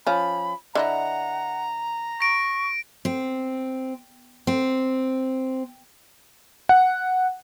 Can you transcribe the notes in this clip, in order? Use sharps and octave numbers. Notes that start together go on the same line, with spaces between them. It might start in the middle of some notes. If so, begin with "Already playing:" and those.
F3 C#4 B5
D3 E4 D#5 F#5 A#5
C#6 A#6 D7
C4
C4
F#5